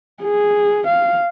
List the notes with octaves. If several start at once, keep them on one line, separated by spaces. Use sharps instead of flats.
G#4
F5